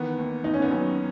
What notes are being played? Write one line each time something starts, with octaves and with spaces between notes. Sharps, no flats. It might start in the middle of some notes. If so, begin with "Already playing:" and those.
Already playing: D#3 E3 B3
D#2
D#2 D#4
C#4
B3
F#3 C#4